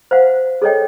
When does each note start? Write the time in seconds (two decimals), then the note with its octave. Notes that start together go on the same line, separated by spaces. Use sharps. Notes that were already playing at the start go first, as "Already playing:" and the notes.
0.11 C5 F5 F#5
0.62 G#4 A4 C#5 D#5 G5